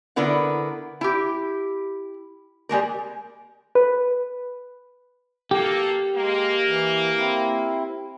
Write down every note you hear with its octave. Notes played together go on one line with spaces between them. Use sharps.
D3 B3 E4 A#4 F#5
E4 G4
G3 G#3 A#3 A#4
B4
A#3 G4 A4
G#3 A#3
E3
C4 E4